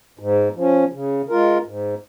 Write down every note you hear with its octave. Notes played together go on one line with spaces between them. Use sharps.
G#2
F3 C#4
C#3
G#3 F4 A#4
G#2